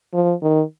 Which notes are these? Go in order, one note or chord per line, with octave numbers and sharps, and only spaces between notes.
F3
D#3